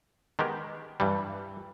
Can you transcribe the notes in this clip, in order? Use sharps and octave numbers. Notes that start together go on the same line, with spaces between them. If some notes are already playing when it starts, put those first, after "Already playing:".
D#3 G#3 B3 G4 A#4
G2 E3 G3